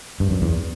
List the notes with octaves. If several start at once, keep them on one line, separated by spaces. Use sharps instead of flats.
G2
F#2
E2